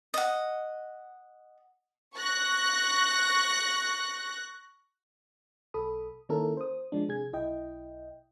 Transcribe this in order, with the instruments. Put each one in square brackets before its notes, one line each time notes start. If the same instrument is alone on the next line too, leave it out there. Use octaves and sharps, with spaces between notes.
[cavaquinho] D#5 F#5
[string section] C#6 F#6 A#6
[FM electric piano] B1 A4 B5 D#6
D#3 A#3 C#4 E4 A4 A#4
C5 D#6
F3 G#3 D4
C3 G#4 G#6
B1 E4 D#5 G5